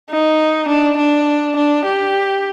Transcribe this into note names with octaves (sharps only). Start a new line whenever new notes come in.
D#4
D4
D4
D4
G4